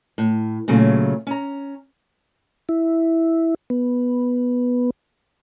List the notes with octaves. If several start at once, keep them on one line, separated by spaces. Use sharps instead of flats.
A2
A#2 C#3 F#3 A3
C#4 A#5
E4
B3